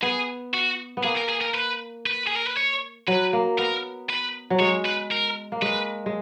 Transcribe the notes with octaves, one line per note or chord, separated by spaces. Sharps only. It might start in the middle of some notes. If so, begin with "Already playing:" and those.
B3 G#4
F#4
B3
A#3 G#4
A#4
G#4
A#4
B4
B4
G#4
A#4
B4
C#5
F#3 B4
A#3
B3 A#4
B4
F#3
G#3 C#5
B4
A#4
A#3
G#3 B4
G#3